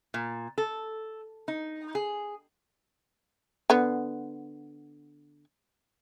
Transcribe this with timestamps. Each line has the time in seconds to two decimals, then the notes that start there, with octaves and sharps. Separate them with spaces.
0.14 A#2
0.58 A4
1.48 D#4
1.95 G#4
3.70 D3 B3